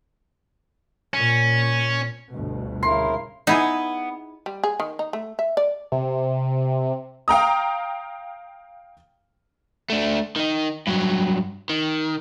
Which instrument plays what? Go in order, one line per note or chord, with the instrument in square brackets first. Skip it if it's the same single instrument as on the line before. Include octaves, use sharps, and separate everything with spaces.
[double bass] A#2 [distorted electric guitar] C#4
[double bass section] G1 D2 B2
[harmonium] C#3 E4 A#4 [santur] C6
[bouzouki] B3 [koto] D#4 E4 G#4
[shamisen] G3
G#4
D#3
D#4
A3
E5
D5
[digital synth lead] C3
[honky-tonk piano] F5 G5 A#5 D#6
[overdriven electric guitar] A3 D4
D#3 D#4
G2 F#3
D#3